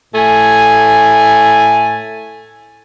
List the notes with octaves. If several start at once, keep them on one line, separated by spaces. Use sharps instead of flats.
A2 A3 G#5